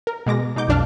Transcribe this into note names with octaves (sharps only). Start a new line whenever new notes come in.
A#4
B2 G#3 D6 A#6
B2 D#4 D6 G6
B1 F2 D4 F5 A5 F6